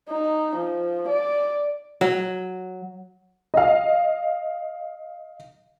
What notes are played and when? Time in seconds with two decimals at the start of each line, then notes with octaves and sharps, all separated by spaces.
0.10 D#4
0.56 F3
1.09 D5
2.01 F#3
3.54 D#5 F5